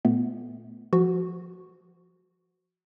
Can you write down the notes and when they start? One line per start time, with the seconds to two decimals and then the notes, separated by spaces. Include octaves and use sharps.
0.05 A#2 A3 B3
0.93 F3 F#4